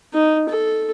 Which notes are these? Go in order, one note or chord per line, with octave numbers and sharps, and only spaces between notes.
D#4
A4